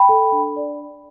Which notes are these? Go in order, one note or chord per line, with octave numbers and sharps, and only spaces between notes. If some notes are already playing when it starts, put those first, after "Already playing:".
Already playing: G5 B5
A4
D4
D5